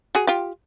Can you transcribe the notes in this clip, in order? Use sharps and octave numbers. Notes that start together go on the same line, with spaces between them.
F#4 G#4
F4 G4